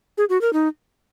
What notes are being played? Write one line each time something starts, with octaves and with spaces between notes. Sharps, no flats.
G#4
F#4
A#4
D#4